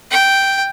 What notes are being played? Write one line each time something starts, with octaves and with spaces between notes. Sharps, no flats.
G5